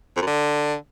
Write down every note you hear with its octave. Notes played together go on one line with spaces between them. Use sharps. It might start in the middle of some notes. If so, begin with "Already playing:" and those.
F2
F#2
D3